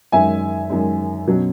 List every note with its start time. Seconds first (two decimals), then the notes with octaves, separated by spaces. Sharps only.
0.12 F#2 D#3 G#3 E5 G#5
0.69 F#2 D#3 G#3
1.27 B2 F#3 C#4